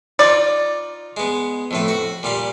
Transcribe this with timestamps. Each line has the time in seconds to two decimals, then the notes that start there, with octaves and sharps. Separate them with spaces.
0.19 D#4 F4 D5
1.17 G#3 B3
1.71 F2 A2 B4
1.88 F#4
2.23 A#2 G3 F5